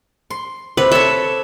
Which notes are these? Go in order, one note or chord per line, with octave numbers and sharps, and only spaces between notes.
C6
C3 B4
A4 C#5 E5